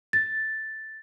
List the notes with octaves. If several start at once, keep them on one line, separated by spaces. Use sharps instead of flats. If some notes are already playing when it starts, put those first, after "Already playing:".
A6